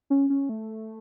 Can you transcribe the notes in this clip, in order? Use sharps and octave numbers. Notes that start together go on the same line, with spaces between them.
C#4
C#4
A3